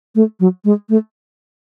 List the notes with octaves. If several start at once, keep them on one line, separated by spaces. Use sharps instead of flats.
A3
F#3
G#3
A3